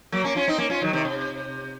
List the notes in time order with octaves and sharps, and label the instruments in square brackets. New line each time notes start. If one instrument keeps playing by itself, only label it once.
[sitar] F#3 A#3
A#3 C#4
C#4 F4
C4 D#4
A#3 C#4
C#4 F4
D#3 F#3
C3 D#3
C3